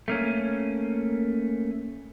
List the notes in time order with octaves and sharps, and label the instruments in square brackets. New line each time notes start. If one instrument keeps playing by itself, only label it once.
[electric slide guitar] A3 A#3 C#4